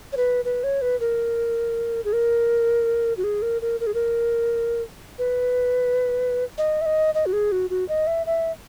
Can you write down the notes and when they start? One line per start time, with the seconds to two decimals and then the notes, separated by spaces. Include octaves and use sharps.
0.13 C#5
0.17 B4
0.45 B4
0.64 C#5
0.82 B4
1.00 A#4
2.05 G#4
2.13 A#4
3.17 F#4
3.24 G#4
3.42 A#4
3.62 A#4
3.80 A#4
3.87 G#4
3.94 A#4
5.19 B4
6.58 D#5
6.81 E5
6.86 D#5
7.15 D#5
7.26 F#4
7.33 G#4
7.52 F#4
7.70 F#4
7.89 D#5
8.07 E5
8.26 E5